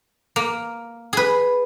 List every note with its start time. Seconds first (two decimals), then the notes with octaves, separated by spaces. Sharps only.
0.36 A#3
1.13 G#4 B4